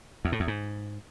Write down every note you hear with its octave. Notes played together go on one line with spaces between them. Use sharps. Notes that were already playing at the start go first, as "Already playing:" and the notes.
E2
A2
E2
G#2